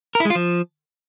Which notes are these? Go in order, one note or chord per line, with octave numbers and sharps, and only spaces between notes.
A#4
E4
G#3
F4
F3